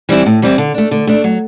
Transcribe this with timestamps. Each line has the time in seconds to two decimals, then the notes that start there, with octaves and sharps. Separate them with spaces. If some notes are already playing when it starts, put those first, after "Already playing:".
0.09 E3 G3 C4 E4
0.26 A2
0.42 E3 G3 C4 E4
0.58 D3
0.74 A3 D4
0.91 D3
1.07 A3 D4
1.24 F#3